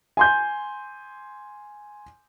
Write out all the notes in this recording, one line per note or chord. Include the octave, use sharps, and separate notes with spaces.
G#5 C6 G6